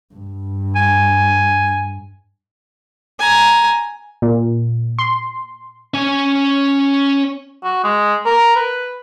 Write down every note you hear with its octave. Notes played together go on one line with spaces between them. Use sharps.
G2
G#5
G#5 A#5
A#2
C6
C#4 G#5
F#4
G#3
A#4
B4